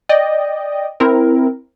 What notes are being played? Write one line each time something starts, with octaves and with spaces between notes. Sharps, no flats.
D5 D#5 G5
C4 E4 A#4